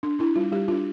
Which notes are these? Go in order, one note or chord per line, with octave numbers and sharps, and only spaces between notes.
D4
D4 E4
G3 F4
G3 G4
D4 F4